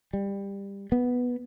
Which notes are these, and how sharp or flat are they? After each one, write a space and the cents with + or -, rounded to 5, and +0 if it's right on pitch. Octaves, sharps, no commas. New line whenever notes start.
G3 +20
B3 +0